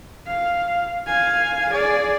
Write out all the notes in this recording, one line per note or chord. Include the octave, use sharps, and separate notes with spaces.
F5
F5 G#5
G#4 D5